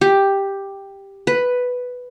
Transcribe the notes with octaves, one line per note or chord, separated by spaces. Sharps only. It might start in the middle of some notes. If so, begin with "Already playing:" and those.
G4
B4